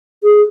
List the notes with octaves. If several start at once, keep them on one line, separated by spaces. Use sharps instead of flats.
G#4